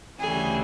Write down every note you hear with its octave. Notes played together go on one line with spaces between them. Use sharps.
D2 C#3 E3 G3 G#4